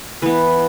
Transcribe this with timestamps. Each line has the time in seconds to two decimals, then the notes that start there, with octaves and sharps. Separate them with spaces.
0.22 E3 B3 B4